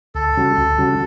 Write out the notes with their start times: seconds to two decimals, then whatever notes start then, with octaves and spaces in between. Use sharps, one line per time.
0.15 D2 A4
0.37 C#3 G3 C#4 F#4
0.58 D2
0.78 C#3 G3 C#4 F#4